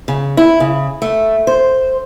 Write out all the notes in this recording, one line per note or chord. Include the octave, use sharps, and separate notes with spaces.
C#3
E4
C#3
A3
C5